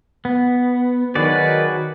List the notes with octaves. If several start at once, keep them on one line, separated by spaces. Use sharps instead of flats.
B3
D#3 F#3 F#4 G#4 B4 D5